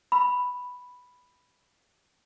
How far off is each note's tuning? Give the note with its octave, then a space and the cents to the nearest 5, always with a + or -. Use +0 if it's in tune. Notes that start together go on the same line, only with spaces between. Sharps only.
B5 +0